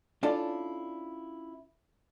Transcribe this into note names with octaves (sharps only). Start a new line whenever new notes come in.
C#4 D4 E4 F4 A4 D5